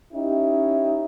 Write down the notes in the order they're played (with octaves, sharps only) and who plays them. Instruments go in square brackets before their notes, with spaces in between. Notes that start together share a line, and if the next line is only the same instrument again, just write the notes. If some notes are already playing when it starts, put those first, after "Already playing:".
[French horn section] C#4 D#4 E4 G4